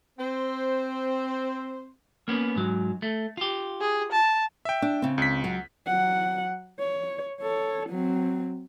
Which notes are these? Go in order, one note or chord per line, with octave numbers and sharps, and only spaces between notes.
C4 C5
A#3 B3 C#4
G#2 F#3
A3
F4 G4
G#4
A5
E5 G5
D4
C#3 C4
C#2 B6
F#3
F#3 F#5
C#5
A4 C#5
F#3 C4